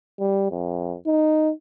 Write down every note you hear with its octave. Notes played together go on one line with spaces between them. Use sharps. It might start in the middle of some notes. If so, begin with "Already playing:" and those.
G3
F2
D#4